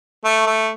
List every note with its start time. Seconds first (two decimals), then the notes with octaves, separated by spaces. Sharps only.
0.25 A3
0.47 A3